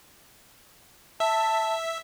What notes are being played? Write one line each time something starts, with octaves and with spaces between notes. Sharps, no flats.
E5 A5